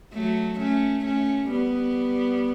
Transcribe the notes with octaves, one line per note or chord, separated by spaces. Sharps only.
F#3 A3
A3 C#4
A3 C#4
G3 B3